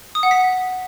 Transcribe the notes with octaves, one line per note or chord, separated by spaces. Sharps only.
D#6
F#5
B6